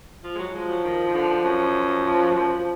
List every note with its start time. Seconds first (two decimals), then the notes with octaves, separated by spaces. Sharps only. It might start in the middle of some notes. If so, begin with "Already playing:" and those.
0.24 F3
0.35 G#3
0.39 F#3
0.53 F3 G#3
0.69 F#3
0.84 D#3
1.08 D#3
1.14 D3
1.44 F#2
2.04 F3
2.34 F3